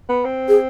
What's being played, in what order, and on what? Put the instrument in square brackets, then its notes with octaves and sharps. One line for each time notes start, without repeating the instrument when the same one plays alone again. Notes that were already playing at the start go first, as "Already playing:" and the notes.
[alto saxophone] B3
C4
[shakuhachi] G#4